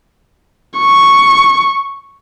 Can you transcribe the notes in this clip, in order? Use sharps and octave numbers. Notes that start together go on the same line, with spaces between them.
C#6